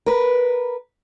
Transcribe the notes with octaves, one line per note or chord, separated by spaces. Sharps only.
A#4 B4